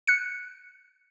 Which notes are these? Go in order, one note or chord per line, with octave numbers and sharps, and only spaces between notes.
F#6 C#7